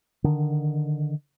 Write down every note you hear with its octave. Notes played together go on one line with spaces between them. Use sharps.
D3 D#3